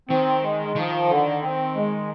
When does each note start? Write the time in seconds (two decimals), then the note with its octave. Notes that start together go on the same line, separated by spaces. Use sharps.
0.09 D#3 C4
0.43 G#3
0.76 D#3 F3
1.09 D3
1.43 C4
1.75 G#3